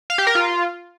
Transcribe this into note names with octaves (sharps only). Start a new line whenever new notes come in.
F5
G4
A#4
F4